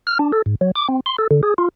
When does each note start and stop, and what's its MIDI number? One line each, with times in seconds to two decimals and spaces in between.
0.07 0.18 89
0.19 0.32 62
0.32 0.42 69
0.46 0.55 44
0.61 0.71 54
0.76 0.88 86
0.88 1.00 60
1.06 1.16 84
1.18 1.27 69
1.31 1.41 50
1.43 1.54 68
1.58 1.69 65